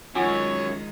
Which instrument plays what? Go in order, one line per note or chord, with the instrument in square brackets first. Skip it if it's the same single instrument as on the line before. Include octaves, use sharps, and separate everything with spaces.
[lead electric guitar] F#2 [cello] D#3 G#3 [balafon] F4 F#5 G#5 [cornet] C#5